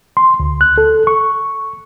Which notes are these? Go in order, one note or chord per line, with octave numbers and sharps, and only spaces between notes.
C6
D2
F#6
A4
C#6